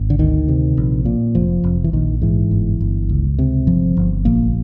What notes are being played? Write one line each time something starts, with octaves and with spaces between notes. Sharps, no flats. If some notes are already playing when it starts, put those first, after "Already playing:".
Already playing: G#1
D3
D2 D#3
C3
A#1
A#2
F1 F3
F1
E3
A#1 D#3
G#2 E3
G1
G1
C#2
C3
G1 F3
G1
A#1 A#3